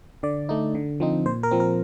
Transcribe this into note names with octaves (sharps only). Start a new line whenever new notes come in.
D3 D5
A3 D#4
D3
F3 C4 D#4
A#2 C5
A#4
F3 C4
A#4